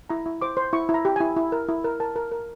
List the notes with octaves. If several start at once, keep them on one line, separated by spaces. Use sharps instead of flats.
E4 A#5
E4
C5 D6
C5
E4 C#6
E4
A#5
G4
E4 G#5
E4
A#4
E4
A#4
A#4 A5
A#4
A#4